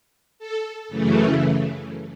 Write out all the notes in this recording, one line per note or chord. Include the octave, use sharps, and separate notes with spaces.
A4
F#2 C#3 E3 A3